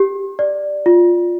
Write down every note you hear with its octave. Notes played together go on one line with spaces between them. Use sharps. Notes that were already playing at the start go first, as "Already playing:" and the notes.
Already playing: G4
D5
F4